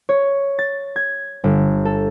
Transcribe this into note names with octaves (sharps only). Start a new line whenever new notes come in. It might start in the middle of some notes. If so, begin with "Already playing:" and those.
C#5
A6
G#6
G1
A4